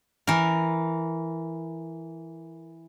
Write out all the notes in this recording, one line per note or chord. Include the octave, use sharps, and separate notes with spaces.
E3 A#4